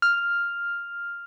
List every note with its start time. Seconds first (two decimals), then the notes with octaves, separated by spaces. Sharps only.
0.02 F6